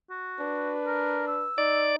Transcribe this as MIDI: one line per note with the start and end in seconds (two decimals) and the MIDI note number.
0.10 0.73 66
0.40 1.47 62
0.40 1.52 71
0.86 1.26 70
1.27 1.81 88
1.58 1.96 63
1.58 1.96 74